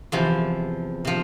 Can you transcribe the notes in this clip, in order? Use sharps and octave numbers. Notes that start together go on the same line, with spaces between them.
E2 C3 F3
C3 F3